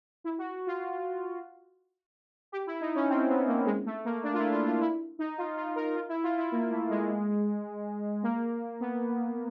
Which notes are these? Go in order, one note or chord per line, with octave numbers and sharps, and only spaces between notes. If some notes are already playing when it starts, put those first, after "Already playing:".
E4
F#4
F4
G4
E4
D#4
C#4
C4
B3
A#3
G#3
A3
A#3
D4
F4
E4
F4
F4
E4
D#4
F4
F4
A#4
F4
E4
F4
E4
A#3
A3
G#3
A#3
B3